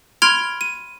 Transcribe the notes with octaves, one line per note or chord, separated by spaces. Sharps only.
B5 C6 F6 G#6 D7 F7
D#7